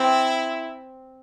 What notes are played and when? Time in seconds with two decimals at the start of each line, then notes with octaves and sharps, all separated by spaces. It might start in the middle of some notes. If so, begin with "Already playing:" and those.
Already playing: C4 E4